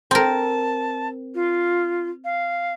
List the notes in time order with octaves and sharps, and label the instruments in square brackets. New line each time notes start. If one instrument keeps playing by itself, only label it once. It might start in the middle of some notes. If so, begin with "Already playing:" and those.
[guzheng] C4 A#4 [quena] A5
[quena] F4
F5